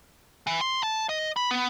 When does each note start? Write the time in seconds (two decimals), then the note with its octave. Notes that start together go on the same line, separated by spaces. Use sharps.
0.47 E3
0.61 C6
0.83 A5
1.09 D#5
1.36 B5
1.51 B3